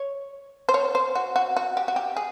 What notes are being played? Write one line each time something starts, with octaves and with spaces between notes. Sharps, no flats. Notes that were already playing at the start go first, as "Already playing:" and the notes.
Already playing: C#5
C5
C#5
C5
F#4
F#4
F#4
G4
F#4
G4
G#4